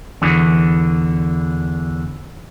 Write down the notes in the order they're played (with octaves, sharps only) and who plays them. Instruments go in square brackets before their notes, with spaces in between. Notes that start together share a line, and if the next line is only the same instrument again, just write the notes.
[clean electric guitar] E2 D3 E3